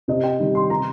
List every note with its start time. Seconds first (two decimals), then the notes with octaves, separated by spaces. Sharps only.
0.08 C3 D#5
0.24 G5
0.39 D#3 G3
0.55 C6
0.70 C3 A#5